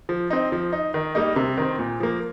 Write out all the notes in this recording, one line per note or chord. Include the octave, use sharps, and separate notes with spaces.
F3
C4 D#4
F3
D#4
D#3
G3 A#3 D#4
C3
D#3 C4
A#2
F3 A#3